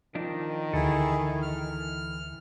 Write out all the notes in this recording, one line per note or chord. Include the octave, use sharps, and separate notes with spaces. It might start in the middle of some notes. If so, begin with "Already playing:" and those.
D#3 F3 D4 D#4
D2 E3 E4 G#4 A4
F6